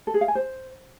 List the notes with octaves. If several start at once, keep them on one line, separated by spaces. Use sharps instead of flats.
A4
G#4
F5
G#5
C5